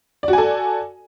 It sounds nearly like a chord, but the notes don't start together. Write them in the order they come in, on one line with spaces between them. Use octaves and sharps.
D5 F#4 G#5 A4